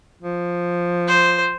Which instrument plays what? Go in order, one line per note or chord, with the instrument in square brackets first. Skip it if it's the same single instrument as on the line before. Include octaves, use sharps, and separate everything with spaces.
[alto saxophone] F3
[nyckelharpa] C5